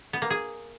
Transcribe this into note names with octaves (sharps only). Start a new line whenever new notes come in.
B3
A#3
G#4